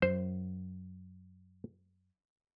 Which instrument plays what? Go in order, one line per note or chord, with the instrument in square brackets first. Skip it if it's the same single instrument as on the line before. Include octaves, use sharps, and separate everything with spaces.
[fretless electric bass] F#2 [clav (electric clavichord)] C5